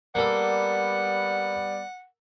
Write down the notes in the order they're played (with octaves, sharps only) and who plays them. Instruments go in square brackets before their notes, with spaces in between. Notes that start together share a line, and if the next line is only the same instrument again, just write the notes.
[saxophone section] G3 B3 D5 [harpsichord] A#3 A4 [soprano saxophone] F#5